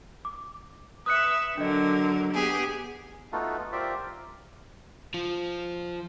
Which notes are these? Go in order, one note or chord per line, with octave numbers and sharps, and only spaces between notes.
D6
B4 E5 D#6 E6 F#6 C#7
D3 F#3 D4 A#4 D#5
B3 G4 G#4
A3 B3 D#4 F4 F#4 A4
F4 G4 A#4 C5 D5 E5
F3 F4